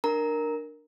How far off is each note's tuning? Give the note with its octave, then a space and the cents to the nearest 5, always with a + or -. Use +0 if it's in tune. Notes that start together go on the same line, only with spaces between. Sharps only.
D4 +20 A#4 +0 A#5 +0